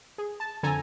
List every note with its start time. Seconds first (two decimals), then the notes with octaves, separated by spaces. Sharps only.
0.18 G#4
0.40 A5
0.63 F2 D3 A4 G#5 A#5